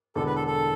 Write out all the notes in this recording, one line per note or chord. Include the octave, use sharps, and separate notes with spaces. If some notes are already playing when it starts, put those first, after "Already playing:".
E1 E2 D3 A4
B4
A4
A4